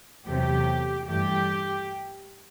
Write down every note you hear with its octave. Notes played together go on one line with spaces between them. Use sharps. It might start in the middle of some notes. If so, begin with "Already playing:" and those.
E2 C3 F#3 A3 G4
G2 E3 A3 G4